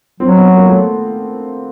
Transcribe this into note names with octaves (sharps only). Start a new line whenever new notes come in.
F#3 C4
B3
A#3
A3